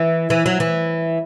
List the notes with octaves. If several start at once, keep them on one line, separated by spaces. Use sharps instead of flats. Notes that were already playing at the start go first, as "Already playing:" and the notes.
Already playing: E3
E3
F#3
E3